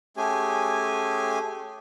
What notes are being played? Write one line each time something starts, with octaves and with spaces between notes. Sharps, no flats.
A3 C#4 G4 G#4 G#5